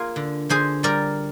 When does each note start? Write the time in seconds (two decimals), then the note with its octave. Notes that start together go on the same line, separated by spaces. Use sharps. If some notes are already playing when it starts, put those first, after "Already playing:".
Already playing: A#3 F4 G#4
0.16 D3
0.49 D3 G#4 C5
0.83 G3 A#4 D5